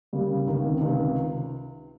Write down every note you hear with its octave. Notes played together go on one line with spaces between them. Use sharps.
C#3 G3 A#3
C#2 C3 D#3
C#2 C3 D#3